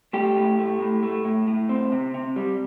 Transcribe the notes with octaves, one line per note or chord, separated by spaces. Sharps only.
A3 G4
A2
A3
A2
A3
A2
A2
C4
C3
C3
G3